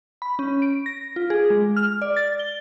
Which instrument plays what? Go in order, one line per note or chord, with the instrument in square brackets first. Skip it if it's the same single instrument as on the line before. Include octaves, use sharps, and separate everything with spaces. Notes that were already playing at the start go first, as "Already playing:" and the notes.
[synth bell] B5
C#4
D7
A#6
F4
G#4
G#3
F6
D5
A6
G7